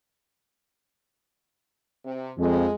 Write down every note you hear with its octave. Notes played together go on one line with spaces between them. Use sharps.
C3
F2 G#3